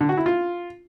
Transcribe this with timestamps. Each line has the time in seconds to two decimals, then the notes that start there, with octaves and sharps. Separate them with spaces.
0.01 D3
0.09 F#4
0.17 E4
0.26 F4